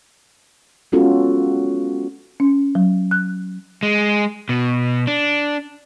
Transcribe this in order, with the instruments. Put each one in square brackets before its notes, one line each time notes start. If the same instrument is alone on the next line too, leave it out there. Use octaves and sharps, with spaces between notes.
[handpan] G#3 B3 C#4 F4 F#4 A4
[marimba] C#4
F#3
F#6
[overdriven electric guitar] G#3
B2
D4